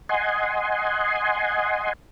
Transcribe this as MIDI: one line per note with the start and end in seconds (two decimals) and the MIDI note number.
0.09 1.93 75
0.09 1.93 78
0.09 1.93 80
0.09 1.93 84